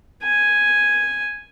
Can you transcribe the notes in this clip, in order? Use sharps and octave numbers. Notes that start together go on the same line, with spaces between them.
G#5